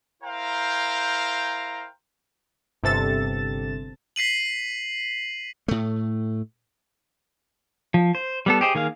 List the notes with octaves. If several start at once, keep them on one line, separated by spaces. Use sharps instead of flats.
E4 A#4 C5 F5 G5 A#5
G1 C3 A4 A6 E7
B6 C7 D#7 F#7
A2 A3
F3
C5
G3 B3 A4
G4 G#4 C5 D#5
D#3 A#3 G#4 F5